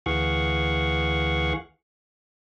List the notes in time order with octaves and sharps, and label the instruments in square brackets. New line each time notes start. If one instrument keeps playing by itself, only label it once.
[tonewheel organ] D2 E3 G#4 F5 F#5 C#6